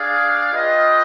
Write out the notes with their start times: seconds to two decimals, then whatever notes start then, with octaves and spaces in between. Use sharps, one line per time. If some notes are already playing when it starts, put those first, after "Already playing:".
Already playing: D4 G#4 D5 F5
0.52 F4 B4 D#5 G5